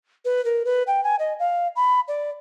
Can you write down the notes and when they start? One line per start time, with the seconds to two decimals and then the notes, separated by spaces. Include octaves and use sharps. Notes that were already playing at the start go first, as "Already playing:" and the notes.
0.25 B4
0.45 A#4
0.65 B4
0.87 G5
1.03 G#5
1.19 D#5
1.39 F5
1.76 B5
2.08 D5